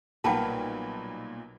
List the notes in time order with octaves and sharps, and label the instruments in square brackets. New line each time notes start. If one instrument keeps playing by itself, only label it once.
[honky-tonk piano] B1 A#2 [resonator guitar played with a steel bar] G3 A#4 B4 [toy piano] F#5 G5 A5